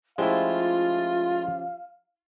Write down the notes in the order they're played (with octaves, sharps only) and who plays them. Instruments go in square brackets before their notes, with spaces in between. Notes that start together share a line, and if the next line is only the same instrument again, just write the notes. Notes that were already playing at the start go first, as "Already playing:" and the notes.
[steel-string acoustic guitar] F3 C#4 G4 [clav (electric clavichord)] G#3 A3 E4 [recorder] F4 [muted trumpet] F5